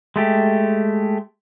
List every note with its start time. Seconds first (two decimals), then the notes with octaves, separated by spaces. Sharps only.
0.16 G#3 A3 G4